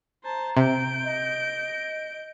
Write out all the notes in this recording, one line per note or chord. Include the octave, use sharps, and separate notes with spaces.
C5 A5 A#5
C3 G6 D7
D#5